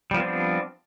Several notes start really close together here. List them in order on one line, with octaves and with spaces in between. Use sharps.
G3 F3 B3 C4 D4